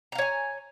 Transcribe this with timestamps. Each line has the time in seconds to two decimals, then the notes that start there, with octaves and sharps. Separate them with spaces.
0.12 A#5
0.15 F5
0.18 C#5
0.22 G#5